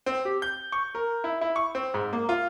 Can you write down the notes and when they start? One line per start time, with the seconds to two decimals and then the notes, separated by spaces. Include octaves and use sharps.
0.06 C4
0.25 G4
0.42 G6
0.72 C#6
0.95 A#4
1.24 E4
1.41 E4
1.56 C#6
1.75 C4
1.94 G#2
2.13 A#3
2.29 F4